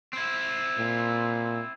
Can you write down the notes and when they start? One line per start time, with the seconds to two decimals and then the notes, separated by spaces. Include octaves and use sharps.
0.13 C4 E4
0.79 A#2